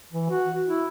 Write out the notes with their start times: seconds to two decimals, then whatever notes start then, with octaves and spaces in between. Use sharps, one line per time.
0.13 E3
0.29 F#4
0.67 E4